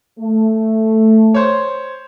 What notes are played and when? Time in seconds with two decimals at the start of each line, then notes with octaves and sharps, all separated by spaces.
0.20 A3
1.34 C5 C#5